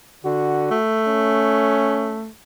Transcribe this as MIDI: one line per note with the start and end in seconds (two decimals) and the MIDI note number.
0.25 0.70 50
0.25 0.77 66
0.71 2.29 57
1.07 2.20 61